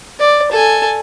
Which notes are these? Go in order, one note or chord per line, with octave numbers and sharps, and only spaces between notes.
D5
A4 G#5